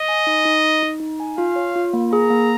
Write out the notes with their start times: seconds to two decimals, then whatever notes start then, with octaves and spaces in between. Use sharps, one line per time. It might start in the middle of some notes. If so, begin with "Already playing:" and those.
Already playing: D#5
0.08 G#5
0.27 D#4
0.45 D#4
0.64 D#4
0.83 D#4
1.00 D#4
1.20 G#5
1.38 F4 F5
1.56 C#5
1.76 F4
1.93 A#3
2.12 G#4 A#5
2.30 A#3